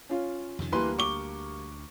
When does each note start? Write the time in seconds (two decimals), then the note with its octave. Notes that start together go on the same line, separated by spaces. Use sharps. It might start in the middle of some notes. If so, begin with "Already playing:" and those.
0.09 C#4 F4
0.59 F2 C3 D#3
0.72 D2 E3 G3 A#3 B4 C6
0.99 C#6 D6 G7